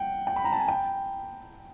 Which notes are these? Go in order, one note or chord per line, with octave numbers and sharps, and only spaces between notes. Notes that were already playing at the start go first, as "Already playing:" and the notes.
Already playing: F#5 G5
G5
B5
A#5
A5
G#5
G5